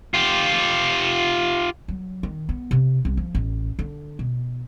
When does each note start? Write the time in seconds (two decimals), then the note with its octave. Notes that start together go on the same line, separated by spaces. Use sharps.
0.14 F4 G4
1.88 F#3
2.23 D#3
2.49 B3
2.71 C3
3.05 C2
3.17 F3
3.35 A1
3.79 D3
4.19 B2